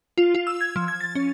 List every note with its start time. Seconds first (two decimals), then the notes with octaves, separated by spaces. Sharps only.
0.18 F4
0.35 F4
0.47 E6
0.61 G#6
0.76 F3
0.88 G#6
1.00 A6
1.15 C#4